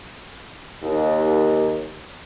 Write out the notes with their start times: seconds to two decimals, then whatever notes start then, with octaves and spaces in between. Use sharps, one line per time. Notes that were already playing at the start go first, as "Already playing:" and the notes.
0.82 D#2